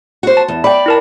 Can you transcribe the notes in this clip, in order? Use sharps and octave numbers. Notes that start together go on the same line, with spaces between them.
F#4 C5
A5
E2
D5 G5 B5
E4 A#4 A5